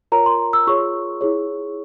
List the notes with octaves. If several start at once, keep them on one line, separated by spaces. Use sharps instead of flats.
F4 A#4 C#5 A#5
C6
E6
F4 G#4 C#5 C#6
E4 G#4 C#5